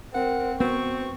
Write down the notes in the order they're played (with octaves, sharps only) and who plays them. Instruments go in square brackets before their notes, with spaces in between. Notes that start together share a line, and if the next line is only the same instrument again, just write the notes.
[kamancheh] C4 [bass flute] A#4 [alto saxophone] F#5
[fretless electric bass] B3 [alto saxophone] C4 [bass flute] F#4 [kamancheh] C#6